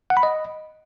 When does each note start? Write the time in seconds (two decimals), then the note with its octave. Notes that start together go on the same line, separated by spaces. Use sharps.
0.10 F#5
0.17 B5
0.23 D#5